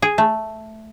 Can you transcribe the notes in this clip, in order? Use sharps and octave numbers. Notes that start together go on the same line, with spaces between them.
G#4
A3